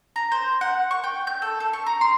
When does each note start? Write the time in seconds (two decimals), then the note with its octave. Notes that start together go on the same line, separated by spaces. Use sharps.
0.16 A#5
0.32 C5
0.61 F#5
0.91 C#6
1.04 G5
1.27 G6
1.42 A4
1.60 A4
1.73 C#6
1.86 A#5
2.01 C6